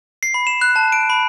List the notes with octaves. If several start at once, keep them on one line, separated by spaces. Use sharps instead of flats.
C7
B5
E7
F#6
A5
D7
B5